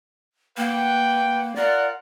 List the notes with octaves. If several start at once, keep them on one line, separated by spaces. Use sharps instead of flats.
A#3 B4 F#5 G5
F4 A#4 D5 F#5